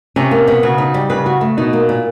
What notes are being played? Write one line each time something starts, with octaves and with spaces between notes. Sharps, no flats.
C3 C#4
A#3
B2
C#3 F#4
D#4
G3
C#3 B4
F#4
A3
B2 D#4
A#3
A#2